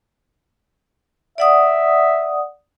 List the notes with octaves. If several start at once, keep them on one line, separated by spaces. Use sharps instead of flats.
D5 E5 F#5 D#6